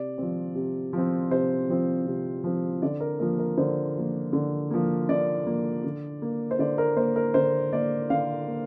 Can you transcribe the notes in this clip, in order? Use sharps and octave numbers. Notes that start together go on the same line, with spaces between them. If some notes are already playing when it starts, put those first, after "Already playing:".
Already playing: C3 D5
F3 C4
C3
F3 C4
C3 C5
F3 C4
C3
F3 C4
D3 D5
A#4
F3 A#3 A#4
A#4
D3 C5
F3 A#3
D3
F3 A#3
D3 D5
F3 A#3
D3
A#3
C5
D3 D5
A#4
A#3 C5
A#4
D3 C5
A#3 D5
D3 F5
A#3